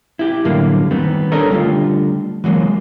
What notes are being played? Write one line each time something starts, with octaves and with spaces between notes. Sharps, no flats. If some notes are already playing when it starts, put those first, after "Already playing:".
E4 G4
F#2 A2 D3 G3 A#3
D#3 G3 B3 C4
D4 A4 A#4 C#5 D#5
D3 G3 A3 F4
E3 F#3 G#3 A#3